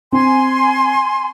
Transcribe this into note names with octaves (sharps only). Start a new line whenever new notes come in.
C4 G#5 C6